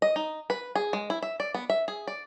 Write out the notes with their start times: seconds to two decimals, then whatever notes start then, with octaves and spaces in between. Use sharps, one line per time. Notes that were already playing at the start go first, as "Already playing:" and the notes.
0.02 D#5
0.16 D#4
0.50 B4
0.75 G#4
0.93 G#3
1.10 E4
1.22 E5
1.40 D5
1.54 B3
1.70 E5
1.88 G#4
2.07 D5